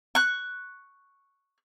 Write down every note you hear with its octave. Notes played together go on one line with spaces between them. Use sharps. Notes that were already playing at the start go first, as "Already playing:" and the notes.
C#6 F#6